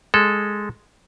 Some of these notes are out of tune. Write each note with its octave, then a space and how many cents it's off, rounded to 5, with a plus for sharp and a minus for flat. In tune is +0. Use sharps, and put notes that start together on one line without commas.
G#3 +0 A4 -5